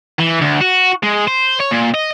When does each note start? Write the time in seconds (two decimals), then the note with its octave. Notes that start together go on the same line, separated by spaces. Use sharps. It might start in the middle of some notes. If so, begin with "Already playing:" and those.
0.19 E3
0.41 D2
0.61 F#4
1.03 G#3
1.27 C5
1.60 C#5
1.71 A#2
1.94 D#5